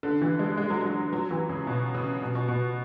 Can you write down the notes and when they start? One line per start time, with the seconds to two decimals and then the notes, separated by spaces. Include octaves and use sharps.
0.03 D3
0.22 E3
0.39 G#3
0.57 G#3
0.70 F#3
0.82 G#3
1.13 F#3
1.31 E3
1.49 C#3
1.67 B2
1.94 C#3
2.22 B2
2.35 B2
2.48 B2